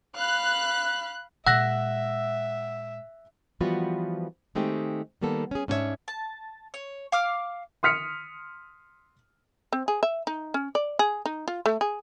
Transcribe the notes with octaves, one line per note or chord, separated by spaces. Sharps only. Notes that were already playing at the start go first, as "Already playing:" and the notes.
F5 B5 F#6
A#2 G#3 E5 F#5 E6 F#6 A#6
E3 F3 G3 B3 F4 F#4
D#3 G#3 A3 C4 D#4 G4
D#3 G3 A#3 B3 A4
C#4 G#4
G#2 C#4 D4 F4 C#5 E5
A5
C#5
F5 D6 F6
C6 D#6 F6 B6 C#7
C4
G#4
E5
D#4
C#4
D5
G#4
D#4
F4
A3
G#4